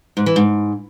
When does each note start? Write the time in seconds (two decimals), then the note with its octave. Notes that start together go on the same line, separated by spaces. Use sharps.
0.17 G#2
0.26 E3
0.36 G#2